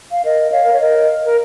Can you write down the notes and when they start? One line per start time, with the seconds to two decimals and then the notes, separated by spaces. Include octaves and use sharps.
0.10 F5
0.24 A#4 D#5
0.52 C#5 F5
0.64 A#4
0.72 C#5
0.80 A#4 D#5
1.25 A#4